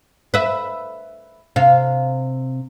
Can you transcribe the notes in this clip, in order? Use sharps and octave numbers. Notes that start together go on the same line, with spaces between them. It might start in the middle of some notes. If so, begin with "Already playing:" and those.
B4 E5
C3 F5